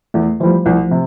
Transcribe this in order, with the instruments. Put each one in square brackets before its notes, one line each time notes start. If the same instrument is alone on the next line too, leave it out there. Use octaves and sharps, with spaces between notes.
[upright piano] E2 [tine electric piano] A3
[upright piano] E3 G3 [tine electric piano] F3
[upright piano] C2
C3